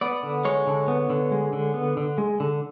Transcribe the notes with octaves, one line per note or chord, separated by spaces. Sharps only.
B3 D5
D3
G#3 C#5
D3
B3
D3
G#3
D3
B3
D3
G#3
D3